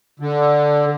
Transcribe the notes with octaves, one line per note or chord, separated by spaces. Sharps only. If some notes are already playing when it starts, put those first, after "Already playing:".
D3